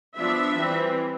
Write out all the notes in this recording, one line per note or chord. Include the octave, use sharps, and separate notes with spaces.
F3 B3 D4 E5
E3 G3 C4